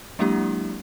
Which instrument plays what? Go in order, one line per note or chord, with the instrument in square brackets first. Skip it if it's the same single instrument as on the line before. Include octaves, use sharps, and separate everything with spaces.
[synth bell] F#3 G#3 A#3 D4 E4 G4